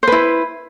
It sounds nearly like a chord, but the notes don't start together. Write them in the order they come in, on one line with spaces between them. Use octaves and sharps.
C5 B4 E4